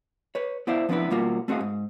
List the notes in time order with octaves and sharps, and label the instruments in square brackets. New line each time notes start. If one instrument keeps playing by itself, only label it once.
[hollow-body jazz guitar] B4 C#5
B3 E4 C5 D5 E5 F5
F3 B3 C4 D4 E4 B4
B2 G3 A#3 F4 F#4
A3 C4 F#4 G#4 D#5 F5
G#2